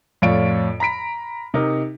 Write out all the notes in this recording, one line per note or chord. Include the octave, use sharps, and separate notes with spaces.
F2 A2 F4 C#5 D5 D7
A#5 B5 B6 D7
C3 D#4 A#4